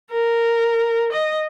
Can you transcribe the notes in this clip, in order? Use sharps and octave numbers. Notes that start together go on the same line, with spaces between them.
A#4
D#5